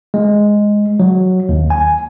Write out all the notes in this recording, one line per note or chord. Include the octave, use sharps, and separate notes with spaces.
G#3
F#3
D#2
G#5